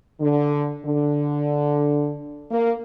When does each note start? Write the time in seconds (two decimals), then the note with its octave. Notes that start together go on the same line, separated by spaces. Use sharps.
0.20 D3
0.85 D3
2.51 A#3